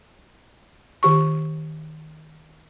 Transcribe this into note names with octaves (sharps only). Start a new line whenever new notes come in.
D#3 G4 C#6